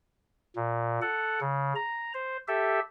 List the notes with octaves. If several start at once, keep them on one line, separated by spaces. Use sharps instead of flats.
A#2
A4 F#5
C#3
A#5
C5
G4 A4 E5